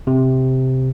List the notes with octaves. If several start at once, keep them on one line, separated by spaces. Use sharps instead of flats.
C3